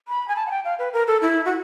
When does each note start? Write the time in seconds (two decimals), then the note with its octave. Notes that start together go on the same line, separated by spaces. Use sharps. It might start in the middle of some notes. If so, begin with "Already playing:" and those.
0.08 B5
0.28 G#5
0.36 A5
0.47 F#5
0.51 G5
0.64 F5
0.79 B4
0.93 A#4
1.07 A4
1.21 E4
1.45 F#4